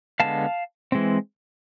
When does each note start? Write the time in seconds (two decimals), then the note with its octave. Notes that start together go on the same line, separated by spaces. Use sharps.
0.20 D3 G#3 B3 F5 A5
0.92 E3 G#3 C4